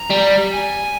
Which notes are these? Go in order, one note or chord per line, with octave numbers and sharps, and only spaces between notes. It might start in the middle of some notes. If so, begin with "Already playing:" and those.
Already playing: A#5
G3
G#5